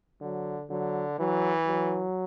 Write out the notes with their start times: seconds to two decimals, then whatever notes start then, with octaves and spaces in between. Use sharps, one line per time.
0.22 D3 F#3
0.70 D3 F#3
1.19 E3 F#3
1.67 F#3